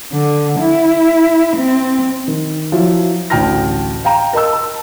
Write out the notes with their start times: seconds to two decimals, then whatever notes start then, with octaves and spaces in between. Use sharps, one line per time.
0.13 D3
0.60 E4
1.57 C4
2.28 D#3
2.72 F3 F#3 E4
3.30 A1 D2 G5 A5 F6 A#6
4.05 F5 G5 A#5
4.33 A#4 D#5 A5 E6
4.53 A5